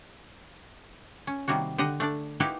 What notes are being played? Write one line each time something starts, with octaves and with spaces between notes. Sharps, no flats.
C#4
C3 D#3 G3 A#3 F#4
D3 G4 D#5 F#5
A3 D4 D5
A#3 D#4 E4 F#4 G4 B4